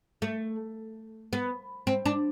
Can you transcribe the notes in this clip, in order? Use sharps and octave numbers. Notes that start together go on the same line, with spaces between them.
A3
B3
C4
D4